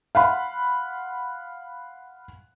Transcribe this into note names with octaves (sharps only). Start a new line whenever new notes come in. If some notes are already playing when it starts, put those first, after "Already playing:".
F5 F#5 B5 C6